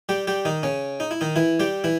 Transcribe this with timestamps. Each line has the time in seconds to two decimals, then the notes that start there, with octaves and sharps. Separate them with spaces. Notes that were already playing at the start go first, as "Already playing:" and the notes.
0.09 G3 G4
0.27 G3 G4
0.45 D#3 D#4
0.63 C#3 C#4
1.00 D#4
1.11 E4
1.21 D#3 D#4
1.36 E3 E4
1.60 G3 G4
1.84 E3 E4